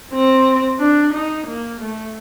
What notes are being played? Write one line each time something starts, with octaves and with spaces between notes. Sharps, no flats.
C4
D4
D#4
A#3
A3